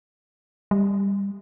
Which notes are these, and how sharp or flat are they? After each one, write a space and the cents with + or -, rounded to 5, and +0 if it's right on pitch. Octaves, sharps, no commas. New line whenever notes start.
G3 +20